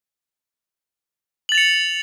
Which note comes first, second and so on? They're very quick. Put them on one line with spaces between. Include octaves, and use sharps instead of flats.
F#7 A6 F7 C#7